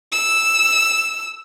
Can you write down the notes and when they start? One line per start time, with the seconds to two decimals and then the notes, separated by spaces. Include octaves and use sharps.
0.12 E6